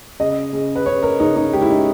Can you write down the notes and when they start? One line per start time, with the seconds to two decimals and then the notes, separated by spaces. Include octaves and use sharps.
0.20 C#3 D#5
0.53 C#3
0.76 B4
0.86 C#3 C#5
1.03 A#4
1.20 C#3 D#4
1.36 D#4
1.53 G#3 G4
1.62 E4
1.70 D#4